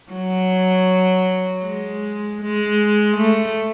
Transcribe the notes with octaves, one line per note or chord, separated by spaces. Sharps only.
F#3
G#3
G#3
A3